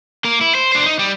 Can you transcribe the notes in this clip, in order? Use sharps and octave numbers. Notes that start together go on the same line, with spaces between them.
A#3 A#4
E4
C5
D4 C5
D#4
G3